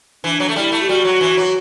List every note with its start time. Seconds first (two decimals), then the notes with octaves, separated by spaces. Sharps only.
0.24 E3 D4
0.40 F#3
0.49 A3
0.56 G3 E4
0.72 A3
0.82 G4
0.88 G3 F#4
1.05 F#3
1.21 E3
1.37 F#3